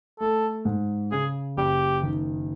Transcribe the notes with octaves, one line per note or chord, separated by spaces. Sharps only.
A3 A4
G#2
C#3 G#4
F#1 G4
D#3